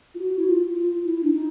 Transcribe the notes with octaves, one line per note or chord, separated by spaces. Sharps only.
F4
F#4
E4
F4
F4
E4
D4
D#4